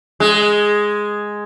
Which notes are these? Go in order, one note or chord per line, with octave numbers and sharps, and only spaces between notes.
G#3